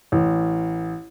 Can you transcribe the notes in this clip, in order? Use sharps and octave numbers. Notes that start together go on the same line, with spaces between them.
A1